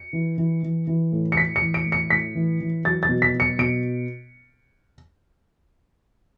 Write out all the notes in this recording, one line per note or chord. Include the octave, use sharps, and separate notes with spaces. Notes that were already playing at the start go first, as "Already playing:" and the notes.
Already playing: C#7
E3
E3
E3
E3
A2
C#7
A2 B6
C#7
E3
D7
A2
C#7
A2 B6
E3
E3
F#3 A6
A6
B2
B6
F#3
C#7
B2 D7